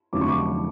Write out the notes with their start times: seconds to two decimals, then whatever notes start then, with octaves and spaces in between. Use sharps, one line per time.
0.13 F1 F2 D3 F#3 C#4 D6
0.21 C#6
0.29 D6